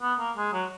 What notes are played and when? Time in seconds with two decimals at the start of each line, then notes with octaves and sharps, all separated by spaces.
0.02 B3
0.19 A#3
0.37 G#3
0.53 F#3